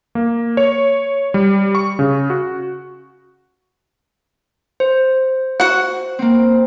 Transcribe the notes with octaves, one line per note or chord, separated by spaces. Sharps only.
A#3
C#5
G3
C#6
C#3
F#4
C5
F#4 F#5
A#3 C4